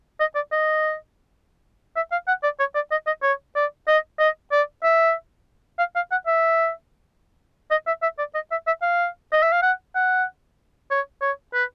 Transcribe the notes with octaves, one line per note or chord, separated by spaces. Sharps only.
D#5
D5
D#5
E5
F5
F#5
D5
C#5
D5
D#5
D#5
C#5
D5
D#5
D#5
D5
E5
F5
F5
F#5
E5
D#5
E5
E5
D5
D#5
E5
E5
F5
D#5
E5
F5
F#5
F#5
C#5
C#5
B4